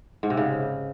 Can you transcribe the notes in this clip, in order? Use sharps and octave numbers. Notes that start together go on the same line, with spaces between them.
G#2
C3
C#3